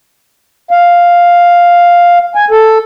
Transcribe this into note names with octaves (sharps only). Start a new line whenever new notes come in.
F5
G#5
A4